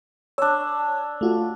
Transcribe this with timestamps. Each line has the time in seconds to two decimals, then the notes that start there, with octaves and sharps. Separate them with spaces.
0.38 D4 C#5 E6
1.21 A3 F4 F#4